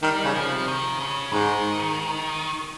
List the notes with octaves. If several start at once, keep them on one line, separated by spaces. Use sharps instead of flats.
D#3 G3
C#3
F3
C3
D#3
C#3
G#2 D#3